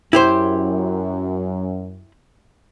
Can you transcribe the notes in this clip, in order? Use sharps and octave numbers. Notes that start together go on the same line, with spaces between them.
F#2 E4 G4 C5